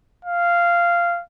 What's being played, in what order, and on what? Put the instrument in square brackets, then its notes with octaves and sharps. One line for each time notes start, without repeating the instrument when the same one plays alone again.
[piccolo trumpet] F5